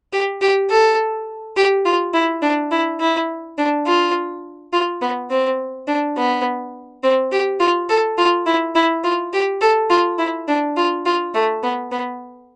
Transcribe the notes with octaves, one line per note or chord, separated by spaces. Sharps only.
G4
G4
A4
G4
F4
E4
D4
E4
E4
D4
F4
F4
B3
C4
D4
B3
C4
G4
F4
A4
F4
E4
E4
F4
G4
A4
F4
E4
D4
F4
F4
A3
B3
B3